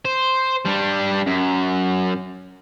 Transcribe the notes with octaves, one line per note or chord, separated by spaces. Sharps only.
C5
G3 D4
F#2